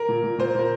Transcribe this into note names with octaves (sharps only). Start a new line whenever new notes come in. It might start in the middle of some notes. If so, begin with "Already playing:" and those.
Already playing: A#4
A#2
A#2
A#2 C5
A#2 A#4